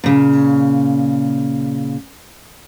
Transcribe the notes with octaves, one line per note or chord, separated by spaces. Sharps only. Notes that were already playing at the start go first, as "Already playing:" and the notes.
A#2 C#3